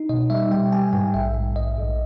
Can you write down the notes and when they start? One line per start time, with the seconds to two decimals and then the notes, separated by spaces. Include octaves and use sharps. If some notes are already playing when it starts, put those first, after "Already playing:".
Already playing: D#4
0.09 B2 D#5
0.30 G3 E5
0.51 G3 G5
0.72 G3 G#5
0.93 G#2 G5
1.14 A#1 E5
1.35 G#2
1.56 A#1 D#5
1.77 A#1